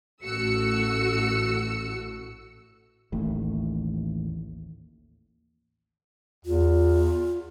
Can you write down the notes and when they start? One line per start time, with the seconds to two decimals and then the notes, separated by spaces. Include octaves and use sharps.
0.23 A1 A3 F#4 E6 C#7
3.12 A1 D#2 A2
6.45 E2 F4